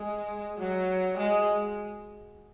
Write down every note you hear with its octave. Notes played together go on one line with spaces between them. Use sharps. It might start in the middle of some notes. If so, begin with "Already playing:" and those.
Already playing: G#3
F#3
G#3